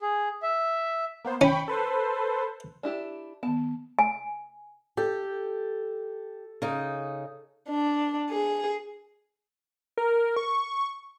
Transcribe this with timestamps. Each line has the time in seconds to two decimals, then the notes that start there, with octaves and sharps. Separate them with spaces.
0.01 G#4
0.42 E5
1.24 A#3 B3 C5
1.41 C#4 G5 B5 C#6
1.68 A4 B4 C5
2.83 D4 E4 G4
3.43 D#3 B3 A5
3.99 G#5
4.97 G4 A4
6.62 C#3 D#4
7.69 D4
8.30 G#4
9.97 A#4
10.36 C#6